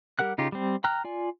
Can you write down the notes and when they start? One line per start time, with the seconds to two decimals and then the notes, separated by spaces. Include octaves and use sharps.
0.19 G3 G4 A#4 F#5 F#6
0.38 C#3 D#4 F4 G4
0.52 G3 C4
0.84 G5 A#5 F6 F#6
1.04 F4 D5 G#5